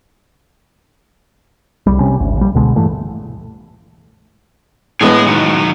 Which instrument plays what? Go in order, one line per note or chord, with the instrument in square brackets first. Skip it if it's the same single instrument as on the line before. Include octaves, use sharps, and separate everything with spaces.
[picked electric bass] C2 G3
C3 G3 C#4
G#1 D2
A#1 G3
C#2 B2 D3 G#3
G2 A#2 E3 A3
[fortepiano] A2 G#3 B3 [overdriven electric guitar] G#4 D#5
[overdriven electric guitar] D#3 F#3